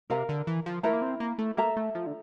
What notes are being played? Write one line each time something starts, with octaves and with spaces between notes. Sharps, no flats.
C3 A#4 F5 A#5
D3
E3
F3
A3 E4 A#4 E5 A#5
A#3
C4
A#3
A3
A#3 A4 E5 A#5
A3
F3
D3